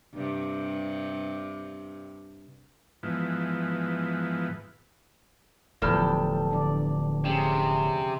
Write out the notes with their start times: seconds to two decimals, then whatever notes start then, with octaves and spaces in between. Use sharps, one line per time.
0.14 G2 C3
3.03 G#2 E3 F3 B3
5.82 D1 E2 F3 G3 A4
6.51 D3 D5
7.25 C3 C#4 G#4